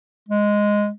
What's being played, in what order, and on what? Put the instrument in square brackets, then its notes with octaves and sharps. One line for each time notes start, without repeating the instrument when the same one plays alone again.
[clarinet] G#3